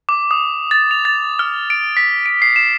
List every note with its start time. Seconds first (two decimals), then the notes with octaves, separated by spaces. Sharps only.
0.09 D6
0.31 D#6
0.71 A6
0.91 F7
1.05 A6
1.39 F6
1.70 D7
1.97 B6
2.26 D7
2.42 C7
2.56 E7